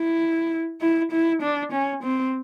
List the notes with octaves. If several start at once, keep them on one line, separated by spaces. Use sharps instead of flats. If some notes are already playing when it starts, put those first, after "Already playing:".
Already playing: E4
E4
E4
D4
C#4
C4